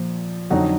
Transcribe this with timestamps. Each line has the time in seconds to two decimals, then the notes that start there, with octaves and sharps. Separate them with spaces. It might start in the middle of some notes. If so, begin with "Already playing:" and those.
Already playing: A#2 F3
0.50 F2 D3 F#3 D#4 F#4